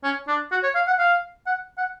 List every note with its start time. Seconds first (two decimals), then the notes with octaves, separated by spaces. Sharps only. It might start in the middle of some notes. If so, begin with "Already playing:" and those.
0.04 C#4
0.28 D4
0.51 F#4
0.63 C#5
0.75 F5
0.87 F#5
0.99 F5
1.47 F#5
1.78 F#5